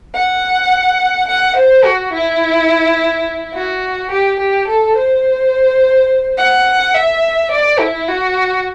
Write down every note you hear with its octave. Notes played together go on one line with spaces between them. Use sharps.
F#5
F#5
C5
F#4
E4
F#4
G4
G4
A4
C5
F#5
E5
D5
E4
F#4